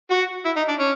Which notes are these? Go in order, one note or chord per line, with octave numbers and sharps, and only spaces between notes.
F#4
E4
D#4
D4
C#4